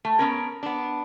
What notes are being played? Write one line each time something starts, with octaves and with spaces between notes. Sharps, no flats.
A3
B3 C#4 A#4
B3 D4